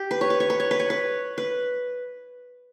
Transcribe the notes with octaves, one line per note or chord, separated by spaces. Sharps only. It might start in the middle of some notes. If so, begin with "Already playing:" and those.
Already playing: G4
B4
C#5
B4
C#5
B4
C#5
B4
C#5
B4
B4